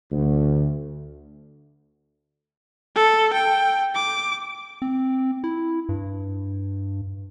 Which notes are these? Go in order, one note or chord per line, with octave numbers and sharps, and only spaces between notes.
D2
A4
G5
D6
C4
E4
G2